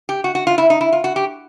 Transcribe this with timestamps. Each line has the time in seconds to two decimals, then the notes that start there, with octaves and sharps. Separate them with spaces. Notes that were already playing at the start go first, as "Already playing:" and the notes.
0.09 G4
0.24 F#4
0.35 F#4
0.47 F4
0.58 E4
0.70 D#4
0.81 E4
0.92 F4
1.04 F#4
1.16 G4